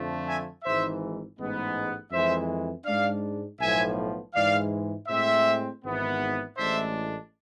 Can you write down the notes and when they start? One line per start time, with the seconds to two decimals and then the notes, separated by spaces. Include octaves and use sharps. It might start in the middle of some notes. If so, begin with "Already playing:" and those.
Already playing: F2 D3 F3 A3
0.26 E5 G#5
0.63 G#1 G#2 E3 C5 E5
1.38 A1 G#2 G#3 B3
2.11 F2 E3 G#3 C5 E5
2.85 G#2 G#3 D4 D5 F5
3.59 B1 A2 F3 B3 E5 G#5
4.35 G#2 E3 G#3 D5 F5
5.08 A2 G#3 C4 C5 E5
5.83 G#1 G#2 E3 B3
6.57 A1 A2 G#3 D4 C5 E5